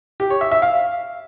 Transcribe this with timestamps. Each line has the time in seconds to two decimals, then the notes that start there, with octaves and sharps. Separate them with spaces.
0.20 G4
0.30 C#5
0.41 E5
0.52 E5
0.62 F5